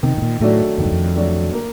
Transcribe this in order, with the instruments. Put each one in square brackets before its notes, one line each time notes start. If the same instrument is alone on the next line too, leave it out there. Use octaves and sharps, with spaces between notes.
[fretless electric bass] C3 [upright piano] D#3
[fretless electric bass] A2
A#2
[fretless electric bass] A2 [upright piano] F#3 A3 D4 F#4
[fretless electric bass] F2 [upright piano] D#3
[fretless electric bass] F#2
F2
[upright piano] F#3 A3 D4 F#4
A#3